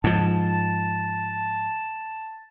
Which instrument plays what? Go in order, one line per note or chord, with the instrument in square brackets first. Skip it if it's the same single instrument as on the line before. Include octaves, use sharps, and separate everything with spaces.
[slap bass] G#2 F3 [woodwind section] A5